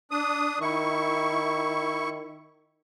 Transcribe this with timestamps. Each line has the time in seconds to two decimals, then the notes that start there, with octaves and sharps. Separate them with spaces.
0.11 D4 D#6
0.61 D#3 E4 C#6